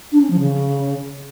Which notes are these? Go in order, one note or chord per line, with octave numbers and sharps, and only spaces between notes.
D4
C#4
F3
C#3